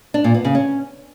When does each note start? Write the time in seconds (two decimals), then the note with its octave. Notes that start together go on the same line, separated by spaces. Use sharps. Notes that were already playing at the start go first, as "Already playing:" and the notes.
0.14 D4
0.24 A#2
0.34 B3
0.45 C#3
0.55 C#4